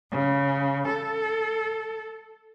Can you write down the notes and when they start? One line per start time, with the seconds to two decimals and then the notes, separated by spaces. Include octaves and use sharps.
0.12 C#3
0.87 A4